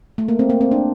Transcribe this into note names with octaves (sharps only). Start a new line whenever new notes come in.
A3
A#3
C4
A#3
C4
D4